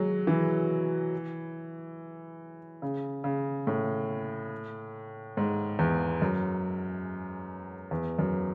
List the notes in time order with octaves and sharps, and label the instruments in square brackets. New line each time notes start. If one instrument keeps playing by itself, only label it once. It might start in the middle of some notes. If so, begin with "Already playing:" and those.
Already playing: [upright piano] F#3 G#3
E3
C#3
C#3
A2
G#2
E2
F#2
E2
F#2